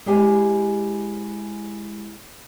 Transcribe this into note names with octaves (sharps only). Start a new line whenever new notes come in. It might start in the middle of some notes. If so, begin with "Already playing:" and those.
G#3 E4 G4 C5 G#5